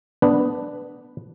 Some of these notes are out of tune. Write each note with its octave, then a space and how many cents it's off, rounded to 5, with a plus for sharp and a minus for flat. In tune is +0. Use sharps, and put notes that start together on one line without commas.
B3 +5 D4 +0 B4 +0